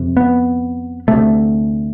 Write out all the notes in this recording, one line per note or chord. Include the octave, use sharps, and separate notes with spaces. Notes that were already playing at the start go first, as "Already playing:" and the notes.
Already playing: F2 C3
B3
D2 C3 A3